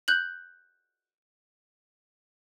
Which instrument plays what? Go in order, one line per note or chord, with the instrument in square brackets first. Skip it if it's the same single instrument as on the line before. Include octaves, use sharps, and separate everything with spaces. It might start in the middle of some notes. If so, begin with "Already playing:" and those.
[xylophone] F#6 G6 F#7